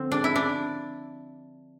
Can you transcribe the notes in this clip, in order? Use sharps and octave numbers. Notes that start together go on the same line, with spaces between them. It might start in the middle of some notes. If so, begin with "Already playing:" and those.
Already playing: D3 F3 C4
D4
E4
D4